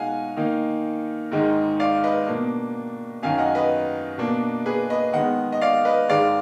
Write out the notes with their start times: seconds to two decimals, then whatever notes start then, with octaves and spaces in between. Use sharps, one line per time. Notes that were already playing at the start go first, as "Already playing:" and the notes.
Already playing: B2 G#3 D#4 F5 F#5 G#5
0.37 D#3 A#3 D#4
1.31 G#2 D#3 G#3 D#4
1.80 D5 F5
2.04 B4 D#5
2.27 B2 A#3 D4
3.23 F#2 D#3 F#3 F5 G#5
3.38 D#5 F#5
3.55 B4 D#5
4.18 B2 A#3 D4
4.66 G#4 B4
4.90 B4 D#5
5.13 D#3 G#3 B3 D#5 F#5
5.52 D#5
5.61 D5 F5
5.85 B4 D#5
6.09 G#2 D#3 G#3 D5 F5